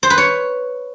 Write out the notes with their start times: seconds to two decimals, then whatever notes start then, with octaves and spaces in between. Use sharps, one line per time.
0.03 C5
0.10 B4
0.18 C#5